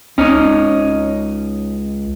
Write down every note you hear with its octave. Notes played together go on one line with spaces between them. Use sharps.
C#2 C#4 D#4